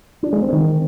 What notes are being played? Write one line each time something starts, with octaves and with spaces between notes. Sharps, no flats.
D4
G#3
C4
D#3